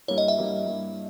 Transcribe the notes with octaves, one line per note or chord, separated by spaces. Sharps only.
G2 G3 A#3 E4 C#5
D#5
E5
G2 G3 A#3 E4
G2 G3 A#3 E4